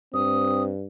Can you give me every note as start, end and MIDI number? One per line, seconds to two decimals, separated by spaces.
0.14 0.86 43
0.14 0.72 60
0.14 0.63 87